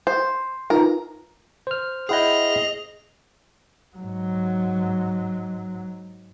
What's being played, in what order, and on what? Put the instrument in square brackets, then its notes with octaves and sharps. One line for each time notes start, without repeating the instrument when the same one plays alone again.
[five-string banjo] C5
[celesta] D#4 F4 B4 [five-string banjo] A#4
[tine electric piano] C5 F6
[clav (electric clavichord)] E4 F#5 G5 [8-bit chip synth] G#4 D#5 [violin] F7
[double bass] G#2 F#3